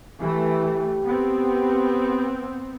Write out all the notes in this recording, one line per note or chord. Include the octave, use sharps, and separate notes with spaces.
E3 A3 G4
B3 C4